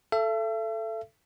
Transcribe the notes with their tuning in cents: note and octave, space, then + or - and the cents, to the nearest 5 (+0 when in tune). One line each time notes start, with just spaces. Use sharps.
A4 +0 E5 +40